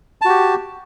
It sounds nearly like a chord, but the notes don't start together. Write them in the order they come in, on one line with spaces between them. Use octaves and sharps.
A5 F#4 G4